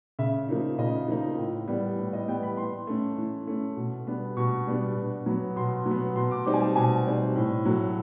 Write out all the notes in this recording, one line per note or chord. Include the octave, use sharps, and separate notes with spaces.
C#3 E5
F3 A#3 D#4
C#3 D#5
F3 A#3 D#4
A2
E3 G3 B3
A2
D#5
E3 G3 B3 G5
B5
E3 C6
A3 C#4
E3
A3 C#4
B2
G3 B3 D4
B2 C#6
G3 B3 D4
B2
F#3 B3
B2 C6
F#3
B3
B2 C6
D6
G3 C4 D#4 D6
G#5
A5
B2 G#5
G3 C4 D#4
A2
F#3 A3